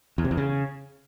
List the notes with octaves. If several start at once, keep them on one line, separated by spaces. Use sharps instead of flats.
E2
C3
E2
C#3